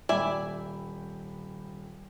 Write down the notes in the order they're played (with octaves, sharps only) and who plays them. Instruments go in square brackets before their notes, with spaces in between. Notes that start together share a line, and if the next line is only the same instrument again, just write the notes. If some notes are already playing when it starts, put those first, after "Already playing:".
[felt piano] D#1 G5 B5 [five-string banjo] D5 E5 G#5